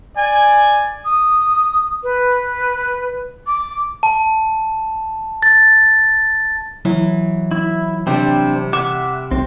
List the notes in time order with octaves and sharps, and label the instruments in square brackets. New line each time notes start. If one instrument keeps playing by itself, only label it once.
[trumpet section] D5 G#5
[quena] D#6
B4
D6
[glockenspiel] A5
A6
[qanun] E3 [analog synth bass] F#3
[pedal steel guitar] E4
[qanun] C3 G3 [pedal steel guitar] C4 D4
[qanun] E5 [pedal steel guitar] F#5 D6
[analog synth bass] B1 [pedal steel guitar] C4